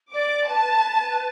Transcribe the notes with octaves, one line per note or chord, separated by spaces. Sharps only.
D5 D6
B4 A5
B4